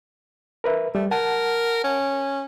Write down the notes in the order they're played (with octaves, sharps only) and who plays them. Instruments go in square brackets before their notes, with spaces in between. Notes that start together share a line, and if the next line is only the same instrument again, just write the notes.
[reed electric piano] A#4 B4 E5
[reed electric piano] G3 [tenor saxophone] A3
[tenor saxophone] A#4 [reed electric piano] F#5 A5
[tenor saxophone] C#4